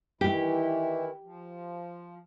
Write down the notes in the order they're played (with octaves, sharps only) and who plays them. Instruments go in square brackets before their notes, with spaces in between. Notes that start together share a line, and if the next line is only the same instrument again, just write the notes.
[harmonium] D#3 E3 E4 [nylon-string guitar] G4
[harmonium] F3